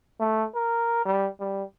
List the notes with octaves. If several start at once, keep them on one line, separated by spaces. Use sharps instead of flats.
A3
A#4
G3
G3